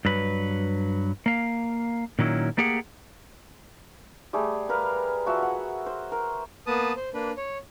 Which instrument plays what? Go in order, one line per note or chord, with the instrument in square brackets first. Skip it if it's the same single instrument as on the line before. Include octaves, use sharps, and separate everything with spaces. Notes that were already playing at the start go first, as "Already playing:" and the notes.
[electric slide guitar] G2 F#3 B4
A#3 F5
A#2 D#3 F#3 C#4 E4
A3 A#3 G4 G#4 F#5
[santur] G3 A3 G#4
A#4 B4 F5
F3 F#4 E5
F#5
C5
A#4
[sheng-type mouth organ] A#3 B3 B4 A5 D#6
C5
A#3 D4 B4
C#5